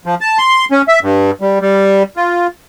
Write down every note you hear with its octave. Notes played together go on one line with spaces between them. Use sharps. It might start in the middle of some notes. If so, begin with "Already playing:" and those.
F3
A5
C6
C#4
E5
G2
G3
G3
F4